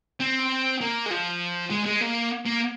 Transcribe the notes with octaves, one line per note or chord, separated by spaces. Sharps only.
C4
A#3
G#3
F3
G#3
G#3
A#3
A#3